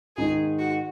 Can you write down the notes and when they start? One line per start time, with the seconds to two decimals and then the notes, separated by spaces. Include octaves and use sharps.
0.17 G#2 D#3 G#3 D#4 G#4
0.59 F#4